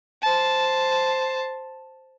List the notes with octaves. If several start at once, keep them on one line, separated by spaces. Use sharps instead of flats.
C5 A5